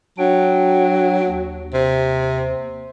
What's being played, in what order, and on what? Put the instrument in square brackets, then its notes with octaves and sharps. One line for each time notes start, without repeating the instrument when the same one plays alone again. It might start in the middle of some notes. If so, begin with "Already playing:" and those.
[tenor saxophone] F#3 [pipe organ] D4 G5
[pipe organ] D#2
[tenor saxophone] C3